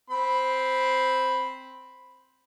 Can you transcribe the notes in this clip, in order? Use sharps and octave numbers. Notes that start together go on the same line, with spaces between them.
C4 B5